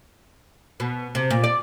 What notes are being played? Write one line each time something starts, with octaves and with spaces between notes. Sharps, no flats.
B2
C3
A#2
D5